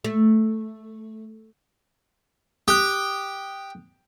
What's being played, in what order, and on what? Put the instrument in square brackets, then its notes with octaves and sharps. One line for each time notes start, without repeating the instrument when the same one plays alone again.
[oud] A3
[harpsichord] G4 [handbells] D#6 F#6